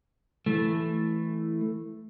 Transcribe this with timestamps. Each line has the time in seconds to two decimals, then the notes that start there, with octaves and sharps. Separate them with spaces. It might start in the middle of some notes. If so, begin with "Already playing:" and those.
0.46 E3 A3